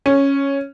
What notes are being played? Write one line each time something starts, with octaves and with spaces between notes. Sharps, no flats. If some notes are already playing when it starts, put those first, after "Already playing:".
C#4